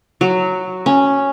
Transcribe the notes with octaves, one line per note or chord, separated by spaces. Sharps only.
F#3
C#4